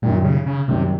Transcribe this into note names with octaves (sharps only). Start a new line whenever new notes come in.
F#2 A#2 D#3 G3
C#3
C#3
F#2 C3 D#3 G3